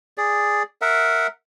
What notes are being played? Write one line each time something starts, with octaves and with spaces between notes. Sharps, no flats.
G#4 D5
A#4 E5 F#5